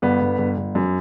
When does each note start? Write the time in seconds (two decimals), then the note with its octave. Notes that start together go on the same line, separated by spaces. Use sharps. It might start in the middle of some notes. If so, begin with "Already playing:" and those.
0.02 G1 B3
0.21 G1
0.38 G1
0.57 G1
0.75 F#2